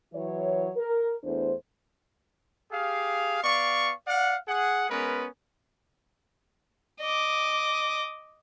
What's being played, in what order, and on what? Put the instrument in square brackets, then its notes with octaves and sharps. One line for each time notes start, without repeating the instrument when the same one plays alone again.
[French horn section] E3 F#3 E4 C#5
A#4
E2 A3 D4 C5
[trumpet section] G4 G#4 F5
B3 D5 F5 C#6
D5 F5 F#5
G#4 F#5
G#3 B3 C#4 A#4 B4
[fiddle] D#5 D6